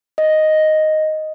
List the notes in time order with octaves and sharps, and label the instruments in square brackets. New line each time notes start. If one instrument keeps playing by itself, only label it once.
[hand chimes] D#5